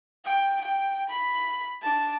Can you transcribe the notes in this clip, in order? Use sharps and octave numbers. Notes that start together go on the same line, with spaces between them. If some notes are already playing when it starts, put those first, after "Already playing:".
G5
G5
B5
D4 A5